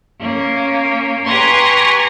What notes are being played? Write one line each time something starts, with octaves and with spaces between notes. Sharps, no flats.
A#3 C#4
G4 B4 G#5 A#5 C6 C#6